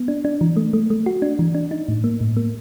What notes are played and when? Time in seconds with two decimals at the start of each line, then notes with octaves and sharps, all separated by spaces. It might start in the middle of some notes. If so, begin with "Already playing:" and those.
Already playing: B3
0.08 D4
0.25 D4
0.41 E3
0.56 A3
0.73 A3
0.90 A3
1.06 F#4
1.22 D4
1.39 E3
1.55 D4
1.71 D#4
1.88 A2
2.04 A#3
2.21 A2
2.36 A#3